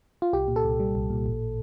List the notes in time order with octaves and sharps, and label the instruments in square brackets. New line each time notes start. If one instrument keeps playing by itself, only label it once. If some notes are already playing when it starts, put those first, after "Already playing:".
[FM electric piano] F4
C2 G4
A#2
A4
C2
G3
C2
A#2
A1